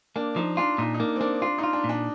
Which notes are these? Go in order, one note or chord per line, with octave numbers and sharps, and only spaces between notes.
A#3 D4
F3 D#4
D4 F4
A#2 D#4
D#4
A#3 D4
C4
A#3 D4
D4 F4
D#4
F4
D4
A#2
D4